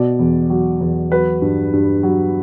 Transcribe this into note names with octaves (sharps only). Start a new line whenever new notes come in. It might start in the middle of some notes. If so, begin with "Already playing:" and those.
Already playing: B2 D5
E2
F#3
E2
F#3 B4
G2
G2
F#3